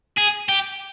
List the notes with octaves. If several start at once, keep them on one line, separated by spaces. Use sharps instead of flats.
G#4
G4